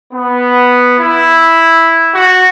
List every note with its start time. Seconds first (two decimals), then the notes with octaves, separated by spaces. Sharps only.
0.12 B3
1.00 E4
2.15 F#4